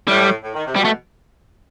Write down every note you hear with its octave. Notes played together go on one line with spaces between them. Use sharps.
A2 G3
A2
D#3
C3
B2 G3
A3